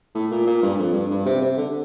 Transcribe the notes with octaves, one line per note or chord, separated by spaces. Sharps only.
A2
A#2
A#2
G2
F2
G2
G2
C3
C3
D3